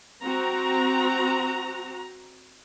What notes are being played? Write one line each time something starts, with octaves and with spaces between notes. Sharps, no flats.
C4 F#4 A#5